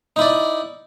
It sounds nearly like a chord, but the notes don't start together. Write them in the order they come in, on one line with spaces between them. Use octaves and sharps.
D#4 E4 D5